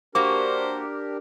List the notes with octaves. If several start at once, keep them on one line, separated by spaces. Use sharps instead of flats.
A#3 D4 F#4 G4 A#4 C5 D6